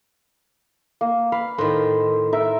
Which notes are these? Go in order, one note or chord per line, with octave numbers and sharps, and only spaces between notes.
A#3
B4 F5
A2 D#3 C5
A#4 E5